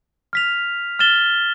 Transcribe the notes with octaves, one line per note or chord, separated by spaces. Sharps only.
F6 B6 F7
F6 A6 E7 G7